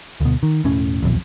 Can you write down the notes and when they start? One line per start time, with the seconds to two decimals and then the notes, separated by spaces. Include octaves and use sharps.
0.21 D2 B2
0.43 D#3
0.64 E1 A2 C#4
1.03 D#1 B1 F2